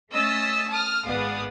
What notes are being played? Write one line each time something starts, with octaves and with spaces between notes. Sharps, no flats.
A3 C#4 D#5 E6 A6 B6
A5 D#6 F6
G#1 B3 G#4 D5 F5 D#6